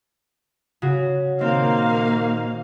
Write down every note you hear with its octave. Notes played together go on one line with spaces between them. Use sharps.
C#3 F#4
A#2 D#3 A#3 C4 D#4 F5